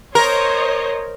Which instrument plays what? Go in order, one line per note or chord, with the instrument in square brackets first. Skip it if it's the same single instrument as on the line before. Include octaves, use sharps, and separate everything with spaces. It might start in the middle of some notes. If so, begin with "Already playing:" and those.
[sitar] A#4 [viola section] C5 C#5 D#5